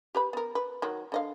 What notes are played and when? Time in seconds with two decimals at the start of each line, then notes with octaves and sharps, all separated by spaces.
0.15 G4 B4 B5
0.33 B3 A#4
0.55 B4
0.82 D#3 F#3
1.12 D3 D#5 F5